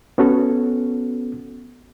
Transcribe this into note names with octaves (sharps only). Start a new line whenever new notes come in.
B3 C#4 F#4 A4